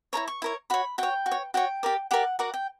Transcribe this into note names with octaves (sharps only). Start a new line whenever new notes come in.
E4 A#4 C#5 A#5
C#6
E4 A#4 C#5
F#4 C#5 B5
F#4 C#5 G5
F#4
C#5
F#4 C#5 G5
G4 A#4 D5
G4 A#4 D5 F#5
F#4 A#4 D5 F#5
G5